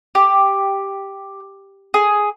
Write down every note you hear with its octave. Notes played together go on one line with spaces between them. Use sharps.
G4
G#4